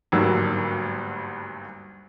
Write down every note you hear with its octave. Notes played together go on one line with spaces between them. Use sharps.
G#1 D2 G2 F#3 A#3 E6